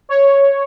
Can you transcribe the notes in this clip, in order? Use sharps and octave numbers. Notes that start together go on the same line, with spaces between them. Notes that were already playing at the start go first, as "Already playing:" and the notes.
C#5